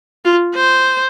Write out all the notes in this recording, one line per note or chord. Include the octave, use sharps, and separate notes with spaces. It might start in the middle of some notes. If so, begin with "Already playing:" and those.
F4
C5